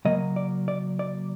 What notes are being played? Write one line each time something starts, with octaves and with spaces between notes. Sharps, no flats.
C#3 F#3 A#3 D#5
D5
D5
D5